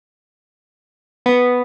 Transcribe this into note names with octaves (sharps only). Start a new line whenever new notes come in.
B3